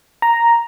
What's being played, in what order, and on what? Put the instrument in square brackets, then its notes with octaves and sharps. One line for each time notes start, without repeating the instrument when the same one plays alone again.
[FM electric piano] A#5